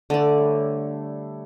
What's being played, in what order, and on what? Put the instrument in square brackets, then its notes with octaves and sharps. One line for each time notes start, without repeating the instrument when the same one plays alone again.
[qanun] D3 D5 [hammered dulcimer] A3 A4
[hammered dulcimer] G3 D4 C#5